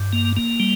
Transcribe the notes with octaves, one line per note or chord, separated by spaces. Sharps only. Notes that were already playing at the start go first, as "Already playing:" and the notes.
Already playing: G2
A#3
A#3
G3